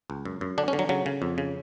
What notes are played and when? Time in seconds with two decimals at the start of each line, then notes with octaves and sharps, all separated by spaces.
0.10 C#2
0.25 F#2
0.41 F#2
0.58 D3 D4
0.68 C#4
0.73 D3
0.79 F#3
0.89 C#3 F#3
1.06 C#3
1.22 F2
1.38 C#3